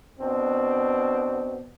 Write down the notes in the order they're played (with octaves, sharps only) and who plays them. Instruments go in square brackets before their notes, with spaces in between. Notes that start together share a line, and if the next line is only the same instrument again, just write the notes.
[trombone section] B2 C4 D4